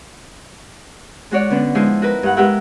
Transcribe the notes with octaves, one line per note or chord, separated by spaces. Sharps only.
G#3 F#4 C#5 D5
D3 B3 C#4 D4
F3 G#3 D#4 E4 C5
F#4 A#4 B4
G2 F#5
G#3 F4 G4 A#4 E5 F#5